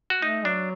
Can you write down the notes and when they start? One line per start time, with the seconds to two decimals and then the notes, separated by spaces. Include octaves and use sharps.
0.10 F#4
0.22 A3 D#4
0.45 F#3 D4